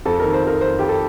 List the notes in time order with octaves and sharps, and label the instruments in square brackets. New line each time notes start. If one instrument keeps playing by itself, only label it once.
[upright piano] F2 A4
D#3 A#4
C5
F2 A#4
F2 C5
F2 G4
A4